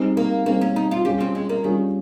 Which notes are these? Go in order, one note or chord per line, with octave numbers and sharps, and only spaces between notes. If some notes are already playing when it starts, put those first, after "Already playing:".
Already playing: G3 C4 D#4 G#4
A#3
G3 A#3 C4 D#4 G#4
C#4
D#4
F4
G3 C#4 F4 G4 G#4
C4
G#3
A#3
D#3 G3 C#4 F4 G#4